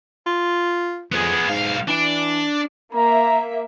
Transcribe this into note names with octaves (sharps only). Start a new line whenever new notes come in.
F4
F2 B3 G#4
B1 G#2 F5
E3 D4 D5
A#3 E5 A#5